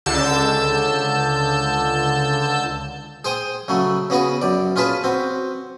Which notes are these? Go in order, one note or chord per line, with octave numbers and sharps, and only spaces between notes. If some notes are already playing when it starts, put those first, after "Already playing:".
C#2 D3 A5 E6 G6
G#4 C5 G5 D#6
C#3 F#3 A3
C#3 B3 F#4 G#4
F#2 D5
C#4 F4 G#4 B4 A5
C4 F#4